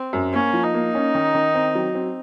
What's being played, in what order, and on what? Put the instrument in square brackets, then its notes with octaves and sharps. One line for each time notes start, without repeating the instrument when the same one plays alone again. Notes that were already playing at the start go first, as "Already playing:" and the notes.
Already playing: [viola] C4
[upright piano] F#2
[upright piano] A#3 [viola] C#4
[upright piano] F3
[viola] D#4
[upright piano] A#3
C#4
D#3
D#3
C4
F#3
C4